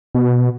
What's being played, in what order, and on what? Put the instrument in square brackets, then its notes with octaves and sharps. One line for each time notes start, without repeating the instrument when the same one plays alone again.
[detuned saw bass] B2